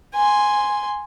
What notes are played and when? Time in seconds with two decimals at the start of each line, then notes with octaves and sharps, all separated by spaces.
0.14 G#5 C6